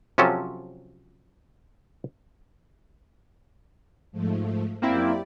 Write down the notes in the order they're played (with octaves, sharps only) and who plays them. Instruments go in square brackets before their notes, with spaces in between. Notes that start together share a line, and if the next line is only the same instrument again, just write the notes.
[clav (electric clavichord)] C3 F3 F#3 C#4 A4
[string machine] G#2 F3 A3
[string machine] F#2 G4 D5 [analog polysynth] A#3 C4 E4